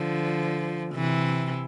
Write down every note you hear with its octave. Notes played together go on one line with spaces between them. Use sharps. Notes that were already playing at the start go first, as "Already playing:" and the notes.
Already playing: D3 F3
C3 E3